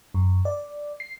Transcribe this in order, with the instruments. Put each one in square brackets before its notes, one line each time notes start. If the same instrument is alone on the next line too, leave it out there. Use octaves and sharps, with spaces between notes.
[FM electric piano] F#2
D5
C7